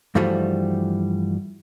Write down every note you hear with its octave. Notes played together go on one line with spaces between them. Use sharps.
G2 E3 F3 G3 A3 F#4